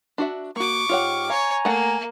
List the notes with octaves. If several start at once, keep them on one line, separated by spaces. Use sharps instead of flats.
D4 F#4 E5
A#3 F#4 C#6 D6
G#2 F4 G4 C#5 F#5 F6
C#5 F5 G#5 A#5
A3 A#3 F#5